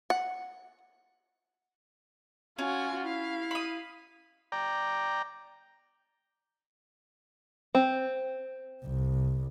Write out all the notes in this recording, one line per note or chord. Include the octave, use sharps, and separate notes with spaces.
F#5
C#4 F4 F#4 G#5
E4 F5
B5 D#6
D5 G5 A#5
C4
C2